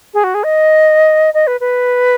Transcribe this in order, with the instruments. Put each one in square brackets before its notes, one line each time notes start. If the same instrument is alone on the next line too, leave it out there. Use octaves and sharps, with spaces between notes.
[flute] G#4
F#4
G#4
D#5
D#5
B4
B4